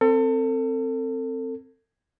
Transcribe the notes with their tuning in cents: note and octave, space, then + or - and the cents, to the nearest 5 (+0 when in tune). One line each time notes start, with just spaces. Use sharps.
C4 +0 A4 +35